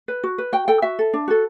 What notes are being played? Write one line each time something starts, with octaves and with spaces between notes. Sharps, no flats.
B4
F#4
B4
F#4 G5
A4 G5
F#4 E5
A4
D4
F#4 A4